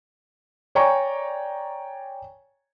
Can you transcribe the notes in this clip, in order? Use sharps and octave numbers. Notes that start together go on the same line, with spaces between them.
C#5 D5 G5 G#5 A#5 C#6